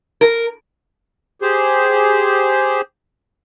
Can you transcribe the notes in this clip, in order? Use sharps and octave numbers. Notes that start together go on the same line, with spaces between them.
A#4
G4 G#4 C5